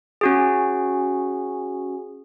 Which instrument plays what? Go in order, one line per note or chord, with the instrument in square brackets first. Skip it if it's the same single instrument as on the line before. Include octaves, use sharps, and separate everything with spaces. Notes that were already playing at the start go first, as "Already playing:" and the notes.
[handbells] C#4 F#4 G#4